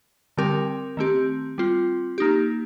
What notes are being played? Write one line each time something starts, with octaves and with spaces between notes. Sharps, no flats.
D3 G3 C4 G4 A#4
D#3 A3 C4 G4
G3 C4 F4
A#3 D#4 G4